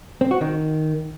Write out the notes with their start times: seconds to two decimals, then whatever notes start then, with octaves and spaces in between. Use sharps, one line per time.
0.21 C4
0.31 F#4
0.41 D#3